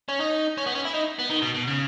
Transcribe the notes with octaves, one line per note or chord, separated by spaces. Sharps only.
C#4
D#4
C#4
B3
C#4
E4
D#4
B3
D#3
B2
B2
C#3